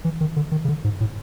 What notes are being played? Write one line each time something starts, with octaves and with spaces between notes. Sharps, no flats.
E3
D#3
D3
D#3
C#3
D3
G#2
A2